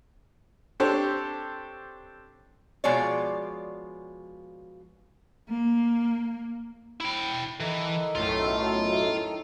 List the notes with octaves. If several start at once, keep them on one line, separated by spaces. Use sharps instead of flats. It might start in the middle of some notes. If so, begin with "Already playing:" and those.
C4 D4 G4 A4 C5 C#5
B2 F3 G#3 F4 C#5 D5
A#3
E4 G5
D#3 E3 D#4 A4
B1 F#2 A2 A3 F4